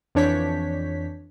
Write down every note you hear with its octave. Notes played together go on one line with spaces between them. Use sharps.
F2 E3 D4 C#5 G6 B6